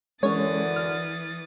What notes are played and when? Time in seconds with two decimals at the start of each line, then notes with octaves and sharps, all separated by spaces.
0.23 F#2 D3 E3 G#3 C#4 C#5 D#6 A6
0.76 F6